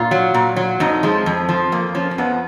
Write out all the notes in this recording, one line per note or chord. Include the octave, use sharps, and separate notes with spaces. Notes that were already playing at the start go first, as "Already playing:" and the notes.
Already playing: A#2 F4
F#3
A#2
F#3
F2 D#4
F3 G#3
F2
F3
F2 A#3
F3 C#4
C#4
F2 B3